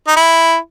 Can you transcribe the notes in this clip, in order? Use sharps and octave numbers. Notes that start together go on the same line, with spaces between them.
D#4
E4